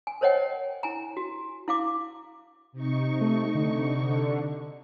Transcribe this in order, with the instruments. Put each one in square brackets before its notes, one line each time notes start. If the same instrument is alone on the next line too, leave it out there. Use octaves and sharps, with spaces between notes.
[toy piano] G#5
A#4 C5 C#5 D#5 F#5 G5
E4 G#5 A#5
F#4
E4 F5 D6
[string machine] C3 D#4 C#6
[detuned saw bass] A3
D3